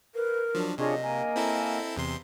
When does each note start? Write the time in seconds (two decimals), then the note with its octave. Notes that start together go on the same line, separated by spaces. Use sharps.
0.15 A#4 B4
0.55 F3 F#3 D4
0.78 C3 D4 F4 G#4 C#5 D#5
1.03 A#3 A#4 G#5
1.36 C4 E4 A4
1.97 E2 C3 C6